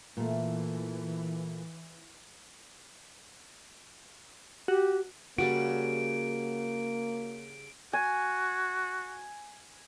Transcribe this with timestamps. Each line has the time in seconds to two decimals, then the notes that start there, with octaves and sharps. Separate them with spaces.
0.17 A#2 E3 A3
4.68 F#4 G4
5.38 C#3 G3 A#3 F#4 D5 D7
7.93 F#4 G#5